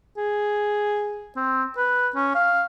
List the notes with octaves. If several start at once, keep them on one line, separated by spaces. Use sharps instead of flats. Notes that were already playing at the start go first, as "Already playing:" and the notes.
G#4
C4
B4
C#4
F5